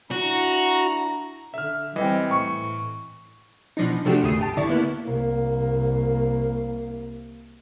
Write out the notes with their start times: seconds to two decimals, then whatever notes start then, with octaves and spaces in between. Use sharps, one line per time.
0.11 D4 E4 F#4 A#5
1.54 D3 E5 F6
1.96 E3 G3 C4 D#5 G5
2.31 A2 C#6
3.77 B2 E3 F3 D4 D#4
4.05 C3 F3 A3 D4 F#4 G4
4.23 G#1 D#2 C#3 A3 D#6 C7
4.39 G#1 G4 A5
4.57 D2 D3 E4 D5 C#6
4.69 A#3 B3 E4
5.06 C2 A#3